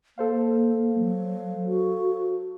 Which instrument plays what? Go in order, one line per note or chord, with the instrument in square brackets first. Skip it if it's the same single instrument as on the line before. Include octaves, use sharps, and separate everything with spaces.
[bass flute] A#3 [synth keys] A4 C5 F5
[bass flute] F#3
F#4